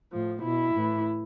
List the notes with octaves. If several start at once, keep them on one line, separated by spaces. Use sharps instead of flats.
A2 F3
B2 E4
A2 E3